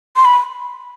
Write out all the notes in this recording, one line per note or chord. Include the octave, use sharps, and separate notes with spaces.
C6
B5